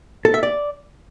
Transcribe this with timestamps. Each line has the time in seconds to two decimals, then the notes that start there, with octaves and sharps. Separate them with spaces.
0.25 A4
0.34 E5
0.43 D5